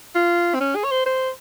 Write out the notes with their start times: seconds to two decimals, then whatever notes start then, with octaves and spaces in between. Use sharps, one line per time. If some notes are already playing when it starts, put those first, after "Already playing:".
0.15 F4
0.55 C4
0.60 C#4
0.75 G#4
0.84 C#5
0.91 C5
1.06 C5